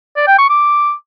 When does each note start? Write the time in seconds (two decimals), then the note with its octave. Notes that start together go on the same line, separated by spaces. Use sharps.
0.16 D5
0.27 G5
0.38 C#6
0.49 D6